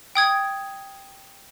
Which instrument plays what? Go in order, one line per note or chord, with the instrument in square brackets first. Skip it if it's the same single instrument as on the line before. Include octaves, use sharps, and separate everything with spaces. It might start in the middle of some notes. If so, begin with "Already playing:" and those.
[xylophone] G5 D#6 G#6